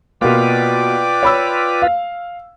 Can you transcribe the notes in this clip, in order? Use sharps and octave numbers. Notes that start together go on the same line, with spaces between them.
B2 A#3 F4 B4 D5 G5 D6
C#5 B5 E6
F5